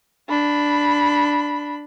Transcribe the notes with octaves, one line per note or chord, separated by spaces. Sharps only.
D4 B5